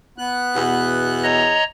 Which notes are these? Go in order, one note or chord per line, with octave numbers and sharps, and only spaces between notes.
B3 F#6
E2 B2
C#5 D#5 A#5